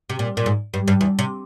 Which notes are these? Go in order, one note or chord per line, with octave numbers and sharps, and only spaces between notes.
C3
A#2
A#2
G#2
G2
G2
E2
C3